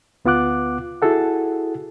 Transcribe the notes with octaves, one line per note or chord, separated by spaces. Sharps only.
D2 B3 F4 F#5 D6 F#6
E4 F#4 G#4 A4 F#5